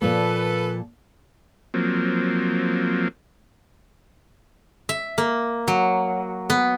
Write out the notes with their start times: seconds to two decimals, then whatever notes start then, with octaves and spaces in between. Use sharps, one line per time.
0.02 A#2 F3 A#3 A4 B4
1.74 F3 F#3 A#3 C4
4.89 E5
5.18 A#3
5.68 F#3
6.50 B3